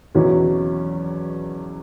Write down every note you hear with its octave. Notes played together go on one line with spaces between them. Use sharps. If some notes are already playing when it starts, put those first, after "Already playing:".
E2 B2 F#3 C#4 E4